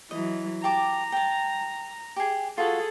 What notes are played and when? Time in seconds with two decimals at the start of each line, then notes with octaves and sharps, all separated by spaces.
0.11 E3 F#3 D#5
0.64 G4 A5 A#5 D6
1.12 G5 A5
2.16 G4 G#4
2.58 F4 F#4 G#4 A4